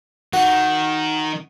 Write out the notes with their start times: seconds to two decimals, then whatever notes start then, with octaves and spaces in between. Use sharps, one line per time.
0.33 D#3 F#4